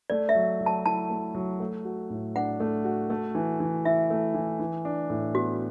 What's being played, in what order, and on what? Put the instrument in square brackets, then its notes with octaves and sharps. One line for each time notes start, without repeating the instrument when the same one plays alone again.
[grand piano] A3 [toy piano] D5
[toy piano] E5
[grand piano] F#3
F#3
[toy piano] A5
[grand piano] E4 [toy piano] A5
[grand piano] A3
F#3
A3
F#4
A2
[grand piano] D4 [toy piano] F#5
[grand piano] A3
F#4
A3
E3
E3
[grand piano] E4 [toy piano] E5
[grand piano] A3
E3
E3
D4
A2
[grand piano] B3 [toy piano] F#4